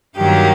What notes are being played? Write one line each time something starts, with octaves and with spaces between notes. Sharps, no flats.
G2 D#3 F#3 A#3 G4